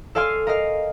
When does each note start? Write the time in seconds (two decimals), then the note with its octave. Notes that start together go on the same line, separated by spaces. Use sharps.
0.15 A4 D5 F5 G#5 C6 F6
0.47 A#4 D#5 F5